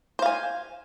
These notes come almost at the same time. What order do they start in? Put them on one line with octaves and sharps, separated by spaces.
C5 F5 G#5